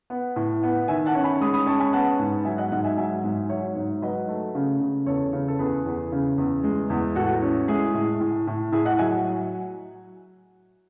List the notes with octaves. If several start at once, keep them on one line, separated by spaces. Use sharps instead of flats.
B3
A2
B3
D#3 E5 G#5
F#5 A5
C#4
G#5 B5
G#3 B5 D#6
B5 D#6
C#4 A5 C#6
G#5 B5
B3 F#5 A5
G#2
F#3 E5 G#5
D#5 F#5
G#2 D#5 F#5
E5 G#5
F#3 E5 G#5
G#2
F#3 C#5 E5
G#2
F#3 B4 D#5
A3
C#3
C#3
E2 A4 C#5
C#3
A4
E2 G#4 B4
E2
C#3
E2
G#3
E2
A2 F#4 A4
C#4
G#3 E4 G#4
A2
A2
A2
A2 E4 G#4
D#5 F#5
F#3 E5 G#5